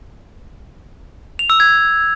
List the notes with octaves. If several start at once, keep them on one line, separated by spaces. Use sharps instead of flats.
F7
E6
G#6